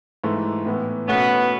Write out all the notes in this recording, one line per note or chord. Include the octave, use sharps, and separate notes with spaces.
G#2 E3 A3
A2 E3 B3
B2 A3 B3 C#4